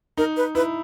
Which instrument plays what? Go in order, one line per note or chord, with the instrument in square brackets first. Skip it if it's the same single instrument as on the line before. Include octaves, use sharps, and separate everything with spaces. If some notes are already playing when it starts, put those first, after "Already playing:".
[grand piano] D#4 [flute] A#4
[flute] B4
[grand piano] E4 [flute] B4